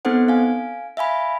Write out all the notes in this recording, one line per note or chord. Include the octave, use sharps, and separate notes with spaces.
B3 C4 D#4 A4 C5 F#5
F5 G#5
E5 F5 G#5 B5